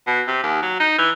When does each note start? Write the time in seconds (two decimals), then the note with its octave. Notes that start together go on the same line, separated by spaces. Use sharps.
0.07 B2
0.28 C3
0.43 D#2
0.63 F#3
0.80 D#4
0.98 E3